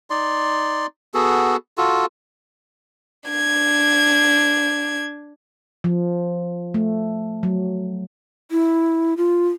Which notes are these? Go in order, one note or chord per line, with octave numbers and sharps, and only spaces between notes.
D#4 D5 C6
B3 F#4 G#4 A4
F4 F#4 A4
D4 G#6
F3
A3
F#3
E4
F4